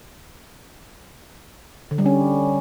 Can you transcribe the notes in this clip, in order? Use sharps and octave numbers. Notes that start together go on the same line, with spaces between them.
D3
G3
C#4